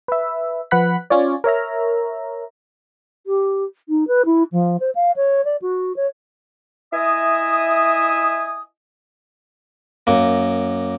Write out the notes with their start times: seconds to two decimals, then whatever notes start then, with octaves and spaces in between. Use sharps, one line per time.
0.08 B4 E5
0.71 F3 B4 F#5 B5 F#6 B6
1.10 C#4 F4 C#5 D5
1.44 A#4 C#5 E5 A#5
3.26 G4
3.89 D#4
4.07 B4
4.25 E4
4.52 F3
4.80 C5
4.95 F5
5.16 C#5
5.44 D5
5.61 F#4
5.96 C#5
6.93 E4 D#5 E5 G#5 D#6
10.07 F#2 A#3